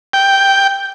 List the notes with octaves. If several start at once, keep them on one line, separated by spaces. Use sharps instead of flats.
G5